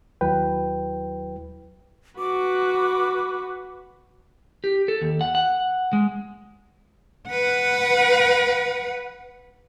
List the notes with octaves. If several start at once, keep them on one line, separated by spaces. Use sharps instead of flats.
D#2 F#3 E4 B4 G5
F#4 B4 D6
G4
A4
D#2
F#5
F#5
G#3
B4 F#5